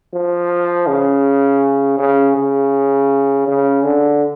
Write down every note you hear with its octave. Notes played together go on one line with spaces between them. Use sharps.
F3
C#3
C#3
C#3
C#3
D3